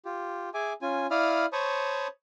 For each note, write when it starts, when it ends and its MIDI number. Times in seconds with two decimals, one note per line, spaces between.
0.05 0.49 65
0.05 0.49 67
0.54 0.73 68
0.54 0.73 76
0.54 0.73 80
0.54 0.73 86
0.82 1.07 61
0.82 1.07 65
0.82 1.07 80
1.11 1.46 64
1.11 1.46 74
1.11 1.46 77
1.11 1.46 83
1.11 1.46 87
1.11 1.46 89
1.53 2.07 72
1.53 2.07 73
1.53 2.07 81
1.53 2.07 83
1.53 2.07 85
1.53 2.07 87